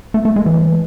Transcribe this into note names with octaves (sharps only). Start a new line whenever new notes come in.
A3
A3
G#3
E3